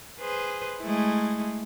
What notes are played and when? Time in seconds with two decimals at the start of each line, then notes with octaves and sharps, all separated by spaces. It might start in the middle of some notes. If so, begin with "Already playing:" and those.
0.20 G#4 B4 C5
0.81 G#3 A3 E4